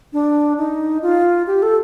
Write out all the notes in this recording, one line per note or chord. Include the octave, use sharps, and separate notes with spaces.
D4
D#4
F4
G4
A4